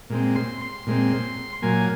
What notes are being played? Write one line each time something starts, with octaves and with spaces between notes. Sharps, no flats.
A#2 G#3 C4
C6
C6
A#2 G#3 C4
A#2 F#3 A#3 G#5